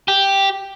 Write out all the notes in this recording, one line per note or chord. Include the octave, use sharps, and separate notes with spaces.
G4